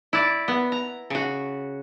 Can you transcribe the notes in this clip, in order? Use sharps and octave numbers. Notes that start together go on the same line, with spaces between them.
E4 D5
B3
A#5
C#3 F#4